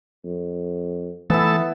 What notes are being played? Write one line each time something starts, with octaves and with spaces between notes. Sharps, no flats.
F2
E3 A3 B3 E4 A5 E6